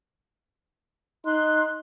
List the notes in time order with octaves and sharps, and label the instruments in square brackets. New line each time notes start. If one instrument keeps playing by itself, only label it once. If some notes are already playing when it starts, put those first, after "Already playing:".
[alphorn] D#4 [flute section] C6 F#6